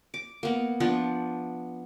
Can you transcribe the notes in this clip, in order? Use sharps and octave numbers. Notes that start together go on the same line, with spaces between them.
D6
A#3 B3
F3 B3 D4